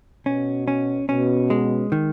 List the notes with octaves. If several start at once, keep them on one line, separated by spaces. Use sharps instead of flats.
B2 C#4
C#4
B2 C#4
G#3
D#3